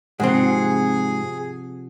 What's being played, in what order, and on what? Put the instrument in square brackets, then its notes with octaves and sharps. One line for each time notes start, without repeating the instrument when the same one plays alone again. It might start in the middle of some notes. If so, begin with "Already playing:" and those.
[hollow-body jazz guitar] G#2 C4 [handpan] C3 F3 F#5 [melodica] G#4